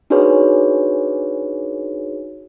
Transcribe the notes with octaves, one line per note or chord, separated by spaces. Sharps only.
D4 D#4 F#4 G#4 B4 C#5